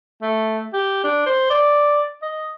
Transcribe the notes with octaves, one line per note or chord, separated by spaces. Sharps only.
A3
G4
D4
C5
D5
D#5